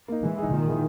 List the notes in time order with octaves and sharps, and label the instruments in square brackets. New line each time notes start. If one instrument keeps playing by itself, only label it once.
[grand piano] A#3 D#4
[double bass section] E3 [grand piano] G#3
[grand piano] D#4 G#4
[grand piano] A#2 [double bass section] D#3
[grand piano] A#3 E4 G#4